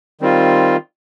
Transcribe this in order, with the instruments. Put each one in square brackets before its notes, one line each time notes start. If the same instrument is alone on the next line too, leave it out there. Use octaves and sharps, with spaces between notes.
[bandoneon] D#3 G3 C4 F4